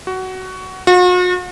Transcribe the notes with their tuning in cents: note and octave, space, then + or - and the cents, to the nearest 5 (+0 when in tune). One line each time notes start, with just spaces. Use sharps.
F#4 +15
F#4 -45